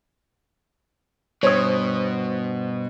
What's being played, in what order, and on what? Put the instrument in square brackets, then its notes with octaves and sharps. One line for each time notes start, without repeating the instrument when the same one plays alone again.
[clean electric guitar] G2 [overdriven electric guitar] B2 [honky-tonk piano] C5 D#6 [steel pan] C#5